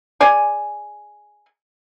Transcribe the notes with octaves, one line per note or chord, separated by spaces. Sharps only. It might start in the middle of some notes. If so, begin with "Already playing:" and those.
G#4 D5 G#5